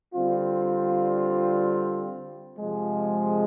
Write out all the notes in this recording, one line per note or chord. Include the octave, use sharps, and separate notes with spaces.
D3 G3 C4 F4
C3 F3 G#3